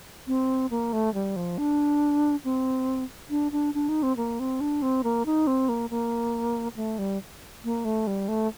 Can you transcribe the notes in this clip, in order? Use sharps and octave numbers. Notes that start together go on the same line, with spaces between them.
C4
A#3
A3
G3
F3
D4
C4
D4
D4
D4
D#4
C4
A#3
C4
D4
C4
A#3
D#4
C4
A#3
A#3
A3
G3
A#3
A3
G3
A3